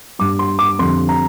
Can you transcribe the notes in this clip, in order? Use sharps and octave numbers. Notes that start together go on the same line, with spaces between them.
G2 G3 D6
C6
D6
F2 D3 G3 C6
A#5